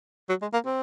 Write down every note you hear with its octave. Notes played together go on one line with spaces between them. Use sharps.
F#3
G#3
A#3
C4